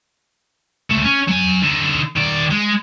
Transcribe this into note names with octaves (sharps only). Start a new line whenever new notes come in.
C#2 A3
C#4
F#3 G#5
D3 D#4
D#3 D5
G#3